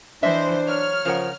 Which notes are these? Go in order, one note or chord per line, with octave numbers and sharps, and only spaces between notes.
E3 D4 C5 D#5 E5
F#3 C#5 F6
C#3 F3 A#4 F#5